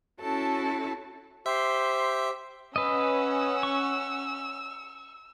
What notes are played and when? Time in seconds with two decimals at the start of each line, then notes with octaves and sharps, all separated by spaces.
0.19 C#4 E4 F#4 A4 A5
1.46 G4 C5 E5 C6
2.76 C#4 B4 D#5 F#5 E6
3.63 C#6